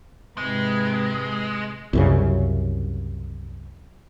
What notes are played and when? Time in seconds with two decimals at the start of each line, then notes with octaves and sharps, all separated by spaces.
0.38 G#2 C3 G#3 B4
1.93 C2 F#2 C#3